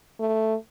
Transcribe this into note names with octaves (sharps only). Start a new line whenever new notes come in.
A3